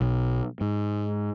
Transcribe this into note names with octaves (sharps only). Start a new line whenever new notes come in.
B1
G#2